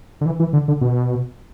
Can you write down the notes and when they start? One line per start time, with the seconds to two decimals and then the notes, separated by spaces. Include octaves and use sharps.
0.21 D3
0.26 E3
0.40 E3
0.53 D3
0.68 D3
0.81 B2